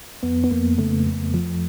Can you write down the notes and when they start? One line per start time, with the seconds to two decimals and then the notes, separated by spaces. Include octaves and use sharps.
0.23 F2 B3
0.44 B3
0.51 F2 A#3
0.78 C#3 A3
1.06 F2
1.34 F3